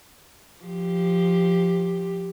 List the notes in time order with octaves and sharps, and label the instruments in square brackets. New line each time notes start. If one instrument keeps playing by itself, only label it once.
[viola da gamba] F3 G4